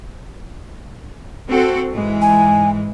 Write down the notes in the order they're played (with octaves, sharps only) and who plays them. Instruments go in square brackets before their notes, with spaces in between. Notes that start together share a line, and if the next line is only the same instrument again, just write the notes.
[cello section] C4 F#4 A4
G#2 E3 G#3
[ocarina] G#5